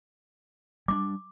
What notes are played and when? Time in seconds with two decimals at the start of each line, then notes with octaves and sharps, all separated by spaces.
0.88 G3 A#3 D4 D6